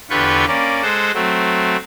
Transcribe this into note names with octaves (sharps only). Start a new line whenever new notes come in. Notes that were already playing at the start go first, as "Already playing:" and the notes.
E2 D3 F4 G4 B4 C#6
A#3 C#4 D5
G#3 A4 C5 F#5
F#3 A3 C4